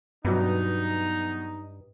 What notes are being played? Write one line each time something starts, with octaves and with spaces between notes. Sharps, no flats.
G2 B2 F#3 B3 D#4